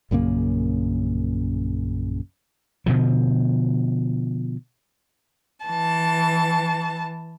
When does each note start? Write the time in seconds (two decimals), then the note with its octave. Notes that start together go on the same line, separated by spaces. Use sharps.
0.11 A#1 F#2 C#3 A#3
2.86 B2 D3 F3
5.66 E3 A5